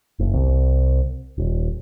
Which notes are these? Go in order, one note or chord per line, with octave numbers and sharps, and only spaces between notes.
F#1
C2
D#1